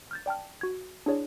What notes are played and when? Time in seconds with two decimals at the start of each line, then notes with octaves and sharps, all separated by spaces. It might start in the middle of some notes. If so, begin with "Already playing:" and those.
0.11 F6 G6 A6
0.26 D5 G5 A5 F6
0.61 F#4 G#6
1.06 D4 E4 G#4 C#5 D5